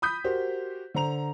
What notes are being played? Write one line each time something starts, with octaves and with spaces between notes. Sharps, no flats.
B5 D#6 G6 B6
F#4 G4 A#4 C5
D3 C5 A#5 F7